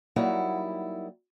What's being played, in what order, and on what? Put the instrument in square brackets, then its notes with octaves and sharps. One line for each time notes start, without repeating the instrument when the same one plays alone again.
[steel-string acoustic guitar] F#3 G3 A#3 D#4 E4 F#5